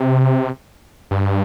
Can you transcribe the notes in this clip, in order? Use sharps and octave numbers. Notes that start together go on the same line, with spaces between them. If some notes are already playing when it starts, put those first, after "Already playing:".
Already playing: C3
G2